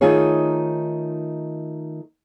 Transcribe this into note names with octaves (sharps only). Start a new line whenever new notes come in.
D#3 A3 D#4 F4 G#4 C#5